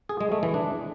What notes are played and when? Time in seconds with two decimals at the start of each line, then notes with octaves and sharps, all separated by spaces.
0.09 G#4
0.21 G#3
0.32 A3
0.43 E3
0.54 D4